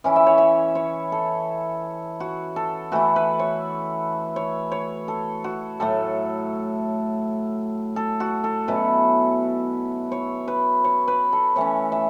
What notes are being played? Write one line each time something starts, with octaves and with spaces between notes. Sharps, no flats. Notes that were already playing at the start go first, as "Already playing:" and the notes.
E3 C#4 E4
E5
C#5
E5
C#5
A4
F#4
A4
E3 A3 E4 F#4
B4
C#5
C#5
C#5
A4
F#4
A2 F#3 A3 A4
A4
F#4
A4
B2 F#3 C#4 E4 B4
C#5
B4
C#5
B4
A4
E3 A3 C#4 C#5
E5